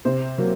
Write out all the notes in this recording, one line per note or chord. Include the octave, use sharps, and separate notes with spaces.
C3 C5
F#3 A#3